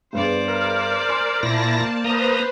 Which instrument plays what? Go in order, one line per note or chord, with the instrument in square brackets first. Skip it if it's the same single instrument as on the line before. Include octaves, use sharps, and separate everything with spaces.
[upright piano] G2 B3 G#4 [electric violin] C5 D5
[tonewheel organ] A#4
[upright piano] G#5 C6
[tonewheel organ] A#2 E4 A#6 [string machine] A#3 A5
[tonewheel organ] A#3 A#5 D#6 [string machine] B4 C5